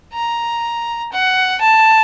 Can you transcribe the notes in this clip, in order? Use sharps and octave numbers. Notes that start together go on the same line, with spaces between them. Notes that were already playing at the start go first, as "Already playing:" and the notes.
A#5
F#5
A5